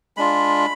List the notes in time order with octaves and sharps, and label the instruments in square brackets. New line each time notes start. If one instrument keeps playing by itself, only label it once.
[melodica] G#3 D4 F4 B5